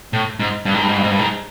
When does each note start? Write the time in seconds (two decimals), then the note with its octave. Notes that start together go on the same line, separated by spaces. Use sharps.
0.13 A2
0.39 G#2
0.65 G2
0.74 G#2
0.81 G2
0.88 G#2
0.97 G2
1.03 G#2
1.11 G2
1.19 G#2